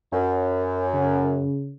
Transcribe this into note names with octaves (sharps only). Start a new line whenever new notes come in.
F#2
C#3